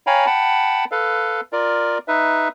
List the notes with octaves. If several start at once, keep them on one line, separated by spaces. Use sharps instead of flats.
C#5 F5 G5 G#5 A#5 B5
F#5 G5 A5 B5
A4 B4 F5
F4 A#4 D5
D#4 B4 E5